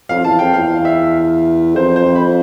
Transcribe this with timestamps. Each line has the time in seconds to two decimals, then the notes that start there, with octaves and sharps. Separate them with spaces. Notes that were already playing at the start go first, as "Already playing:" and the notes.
0.09 F2 F5
0.24 E2 A5
0.39 F2 G5
0.54 E2 F5
0.85 E5
1.75 F2 C5
1.96 C5
2.05 F2
2.15 B5